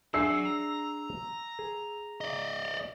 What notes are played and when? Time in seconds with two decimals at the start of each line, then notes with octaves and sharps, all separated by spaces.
0.14 F#3 D4 G#4 E5 E6 C7
0.45 A#5
1.59 G#4
2.21 D5 D#5